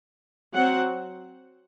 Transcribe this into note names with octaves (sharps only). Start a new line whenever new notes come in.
F#3 C4 F#5